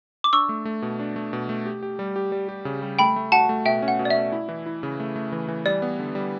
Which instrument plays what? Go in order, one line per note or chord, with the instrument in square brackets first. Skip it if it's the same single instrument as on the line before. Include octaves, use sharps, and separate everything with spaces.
[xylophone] D6
[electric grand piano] D4 [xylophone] C#6 E6
[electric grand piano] A3
A3
B2
D4
A3
B2
A3
G4
G4
G3
G4
G3
G4
C#3
G3
[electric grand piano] A3 [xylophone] G5 B5
[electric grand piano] A3
[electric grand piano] F#4 [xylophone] F#5 A5
[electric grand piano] A3
[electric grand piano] B2 [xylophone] E5 G5
[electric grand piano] C#4
[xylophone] F#5
[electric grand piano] B2
[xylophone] D5
[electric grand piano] A3 [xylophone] E5
[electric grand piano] E4
E3
E4
C#3
A3
A3
E3
E3
[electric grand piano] G3 [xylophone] D5
[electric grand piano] B3
D3
G3